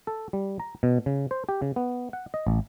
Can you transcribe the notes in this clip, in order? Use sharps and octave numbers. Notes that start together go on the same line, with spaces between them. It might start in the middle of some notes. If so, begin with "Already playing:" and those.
A4
G3
A#5
B2
C#3
C5
G4
C#3
B3
F#5
D#5
A1